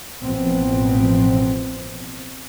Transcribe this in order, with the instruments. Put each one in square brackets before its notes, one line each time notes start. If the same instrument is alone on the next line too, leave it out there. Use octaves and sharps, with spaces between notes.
[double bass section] A1 B2 F3 B3 C4